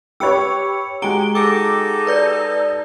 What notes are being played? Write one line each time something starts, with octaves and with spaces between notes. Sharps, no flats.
G4 B4 C#5 E6 C#7
G#3 F#4 G4 A#5 D7 G7
D#4 G#4 A4 D6
B4 D5 G6